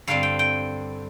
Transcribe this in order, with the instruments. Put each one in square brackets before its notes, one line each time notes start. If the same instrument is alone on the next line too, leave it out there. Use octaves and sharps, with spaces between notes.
[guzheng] G2 D3 G3 C4 F5
G5
G5